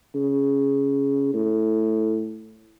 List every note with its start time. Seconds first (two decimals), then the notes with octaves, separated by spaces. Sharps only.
0.15 C#3
1.33 A2